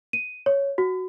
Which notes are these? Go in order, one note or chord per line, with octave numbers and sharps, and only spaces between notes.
D#7
C#5
F#4